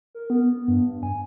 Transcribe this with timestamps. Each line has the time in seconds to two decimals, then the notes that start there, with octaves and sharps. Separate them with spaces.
0.15 A#4
0.30 B3
0.68 G2
1.03 G#5